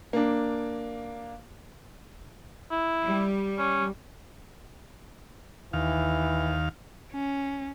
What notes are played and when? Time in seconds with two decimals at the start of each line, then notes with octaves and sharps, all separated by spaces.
0.13 A#3 D4
2.71 E4
3.04 G3
3.59 C#4
5.73 D#2 E3 F5
7.12 C#4